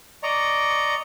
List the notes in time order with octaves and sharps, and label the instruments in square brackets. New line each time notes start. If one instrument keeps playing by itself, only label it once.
[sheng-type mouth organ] D5 D#5 A#5 C#6